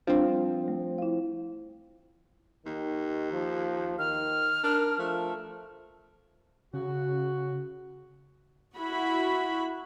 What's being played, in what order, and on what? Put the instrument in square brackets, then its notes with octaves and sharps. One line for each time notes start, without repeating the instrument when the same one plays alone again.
[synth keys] F3 C4 [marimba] G3 D4
[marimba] A3
E4 F5
[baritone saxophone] D#2 [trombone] D#3
[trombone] F3
[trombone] D#3 [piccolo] F6
[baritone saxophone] D4 [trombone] A#4
[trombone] F3 [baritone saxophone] A3
[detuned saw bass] C#3 [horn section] F#4
[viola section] E4 F#4 B5